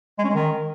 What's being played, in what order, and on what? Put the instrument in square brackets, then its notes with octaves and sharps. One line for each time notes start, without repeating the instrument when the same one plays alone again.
[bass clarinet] G#3
C#4
G#3
D#3